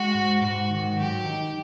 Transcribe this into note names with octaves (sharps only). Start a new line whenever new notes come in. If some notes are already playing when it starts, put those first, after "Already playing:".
Already playing: G#3 F#4
G#2
G#2 F#4
D#3
F#3 G4
D#4